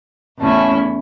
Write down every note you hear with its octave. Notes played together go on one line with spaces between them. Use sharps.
E2 C#3 A3 C#4 E4 A5